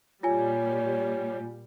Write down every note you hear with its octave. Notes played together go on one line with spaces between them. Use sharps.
A#2 G3 F4 C#5 G#5